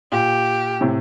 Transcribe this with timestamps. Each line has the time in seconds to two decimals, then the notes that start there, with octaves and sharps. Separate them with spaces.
0.11 A#2 G4
0.81 A2 C3